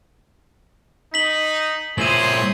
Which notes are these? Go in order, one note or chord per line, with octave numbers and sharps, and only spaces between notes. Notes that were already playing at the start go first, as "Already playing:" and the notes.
D#4 B6 F#7 G7
A#2 E4 G#4 C5 C#5 D#7 F#7